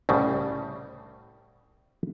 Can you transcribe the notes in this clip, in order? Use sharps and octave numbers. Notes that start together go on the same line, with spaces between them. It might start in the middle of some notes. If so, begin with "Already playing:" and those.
C2 A2 C#3 G3